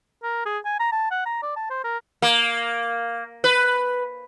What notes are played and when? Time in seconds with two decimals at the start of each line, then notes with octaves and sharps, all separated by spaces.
0.23 A#4
0.46 G#4
0.65 G#5
0.79 A#5
0.92 A5
1.11 F#5
1.26 A#5
1.42 D5
1.56 A5
1.70 C5
1.84 A#4
2.22 A#3
3.44 B4